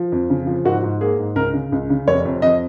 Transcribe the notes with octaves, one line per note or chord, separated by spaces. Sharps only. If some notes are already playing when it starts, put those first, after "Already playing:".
Already playing: F3
F2
C#3
F3
G#2 F#4
G#2
A#3 G#4
G#2
C#2 A#4
C#3
C#2
C#3
F1 C#5
F2
F2 D#5